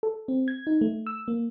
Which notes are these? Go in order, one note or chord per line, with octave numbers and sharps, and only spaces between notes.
A4
C4
G#6
D#4
A3
E6
A#3